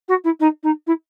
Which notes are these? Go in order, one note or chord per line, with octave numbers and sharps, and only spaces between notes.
F#4
E4
D#4
D#4
E4